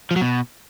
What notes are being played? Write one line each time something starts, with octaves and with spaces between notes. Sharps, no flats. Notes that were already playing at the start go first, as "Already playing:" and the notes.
F3
F#3
B2